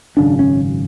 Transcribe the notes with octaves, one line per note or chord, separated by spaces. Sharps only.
G#1 F#2 C#3 D4
C#4